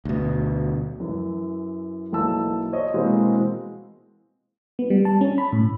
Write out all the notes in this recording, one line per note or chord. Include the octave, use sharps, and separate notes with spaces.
D2 B2
F#2 E3
B1 E3 A#3 E4 A5 E6
C5 C#5 D#5
B2 E3 G#3 A#3 C4
B3
G3
A5
C#4
B5
A2